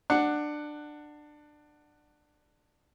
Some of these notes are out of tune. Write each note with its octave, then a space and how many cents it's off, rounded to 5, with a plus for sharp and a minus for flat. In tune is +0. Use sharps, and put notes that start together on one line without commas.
D4 +20 F#5 +0